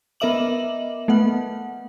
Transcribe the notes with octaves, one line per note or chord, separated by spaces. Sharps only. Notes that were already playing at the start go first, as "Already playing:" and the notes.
B3 A#4 D#5 E5 D6 F#7
A3 B3 F#5